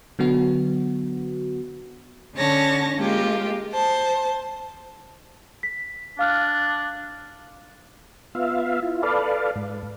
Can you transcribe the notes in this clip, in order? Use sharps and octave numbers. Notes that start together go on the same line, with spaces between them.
D3 F#3 B3 F#4
D3 C#4 C#5 A5 A#6
G#3 A#3 F4 G4
C5 A5
B6
D4 F5 F6 F#6
B3 F4 E5 F5
E4 F4
A4 B4 D5 F5
G#2